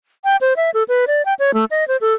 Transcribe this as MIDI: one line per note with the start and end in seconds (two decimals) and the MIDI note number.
0.25 0.36 79
0.41 0.53 72
0.57 0.70 76
0.74 0.83 69
0.88 1.05 71
1.07 1.25 74
1.26 1.34 79
1.39 1.54 73
1.54 1.65 57
1.71 1.87 75
1.88 1.97 72
2.01 2.14 69